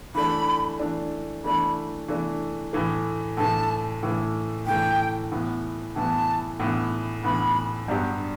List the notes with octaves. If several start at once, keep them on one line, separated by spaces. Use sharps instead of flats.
E3 A3 D4 B5
E3 A3 D4
E3 A3 D4 B5
E3 A3 D4
A2 E3 A3
A2 E3 A3 A5
A2 E3 A3
A2 E3 A3 G5
A2 E3 B3
A2 E3 B3 A5
A2 E3 B3
A2 E3 B3 B5
G2 F#3 B3 D4 G4